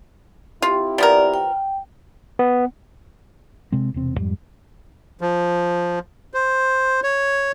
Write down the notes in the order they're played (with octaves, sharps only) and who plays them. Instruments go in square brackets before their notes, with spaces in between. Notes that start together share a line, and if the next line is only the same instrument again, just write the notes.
[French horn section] C4 E4 G4 [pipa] F4
[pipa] F3 B3 A#4 [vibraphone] D5
[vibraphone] G5
[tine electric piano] B3
[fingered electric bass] C3 G#3 C4
E1 C3 C4
F2 G#2 G3
[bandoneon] F3
C5
C#5